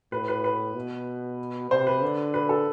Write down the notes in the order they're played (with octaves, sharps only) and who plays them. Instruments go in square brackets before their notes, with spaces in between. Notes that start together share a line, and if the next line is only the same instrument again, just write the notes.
[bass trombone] A2 [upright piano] B4
[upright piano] B4
B4
[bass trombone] B2
[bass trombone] C3 [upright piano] C5
[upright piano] B4
[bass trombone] D3
[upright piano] B4
A4